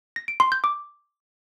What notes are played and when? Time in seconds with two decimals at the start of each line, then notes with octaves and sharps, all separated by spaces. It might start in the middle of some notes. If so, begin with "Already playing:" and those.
0.16 A#6
0.28 D7
0.40 C6
0.52 G6
0.64 D6